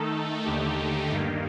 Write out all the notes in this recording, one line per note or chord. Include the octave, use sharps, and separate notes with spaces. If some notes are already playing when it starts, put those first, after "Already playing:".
Already playing: D#3 A3 D#4 A4
D#2 D3 A3 D#4 G4
G2 D#3 A#3